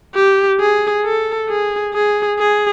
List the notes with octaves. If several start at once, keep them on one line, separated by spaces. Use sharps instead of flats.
G4
G#4
A4
G#4
G#4
G#4